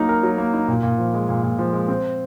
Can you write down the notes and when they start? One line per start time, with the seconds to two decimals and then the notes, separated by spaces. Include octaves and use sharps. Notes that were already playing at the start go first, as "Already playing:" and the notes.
Already playing: F#3 A#3 D#4
0.09 A#4
0.23 F#3
0.38 A#3
0.54 D#4
0.68 A#2
0.83 A#2
0.98 F3
1.14 G#3
1.29 A#2
1.43 A#2
1.59 F3
1.73 G#3
1.88 C4